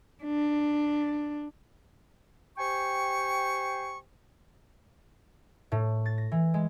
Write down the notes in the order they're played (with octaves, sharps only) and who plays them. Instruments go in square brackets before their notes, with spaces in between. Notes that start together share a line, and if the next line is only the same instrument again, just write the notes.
[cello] D4
[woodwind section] G4 C5 G5 G#5 C#6
[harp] A2
A6
A#6
E3
G#3